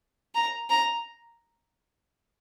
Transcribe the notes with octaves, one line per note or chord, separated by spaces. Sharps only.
A#5
A#5